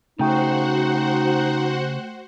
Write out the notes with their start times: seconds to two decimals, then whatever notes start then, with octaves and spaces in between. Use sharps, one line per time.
0.19 C#3 A3 D#4 F#4 C5 F#5 G5 C#6